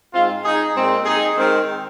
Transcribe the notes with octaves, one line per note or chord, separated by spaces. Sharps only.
G#2 G#3 C4 F4
D#4 G#4
A#2 G#3 C4
D#4 G#4
D#3 G#3 C4